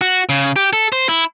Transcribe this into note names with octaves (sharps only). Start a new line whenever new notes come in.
F#4
C#3
G4
A4
C5
E4